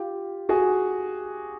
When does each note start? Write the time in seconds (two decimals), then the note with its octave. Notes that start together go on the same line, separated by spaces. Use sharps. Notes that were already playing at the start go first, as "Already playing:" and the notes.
Already playing: F4 G4
0.49 F#4 G#4